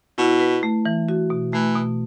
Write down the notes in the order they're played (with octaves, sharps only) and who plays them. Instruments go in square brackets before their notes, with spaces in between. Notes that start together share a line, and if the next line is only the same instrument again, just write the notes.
[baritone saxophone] B2 [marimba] E4
[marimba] B4
A3
E3
F#4
B2
[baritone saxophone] E3 [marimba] A3
[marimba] B2